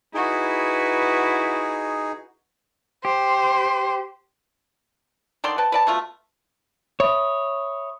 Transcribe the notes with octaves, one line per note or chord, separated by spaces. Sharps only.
D#4 E4 F#4 G#4 B4
G4 C5
D3 D#3 D5 C6
B4 G5 A5
B4 D5 A5
B2 A3 F4
C#5 E5 B5 D#6